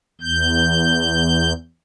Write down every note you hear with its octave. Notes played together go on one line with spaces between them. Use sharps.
E2 G6